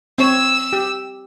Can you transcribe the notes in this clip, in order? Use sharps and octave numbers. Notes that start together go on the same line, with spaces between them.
C4 C#5 E6
G4